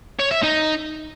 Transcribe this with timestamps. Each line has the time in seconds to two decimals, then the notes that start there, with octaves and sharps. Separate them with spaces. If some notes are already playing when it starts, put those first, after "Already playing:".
0.20 C#5
0.31 E5
0.43 D#4